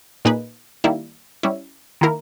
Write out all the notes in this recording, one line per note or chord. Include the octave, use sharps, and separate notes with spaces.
A#2 A#3 D#4 G#4 B4
D#3 G3 A#3 E4
G3 C#4 E4
D#3 A#3 E4 A#4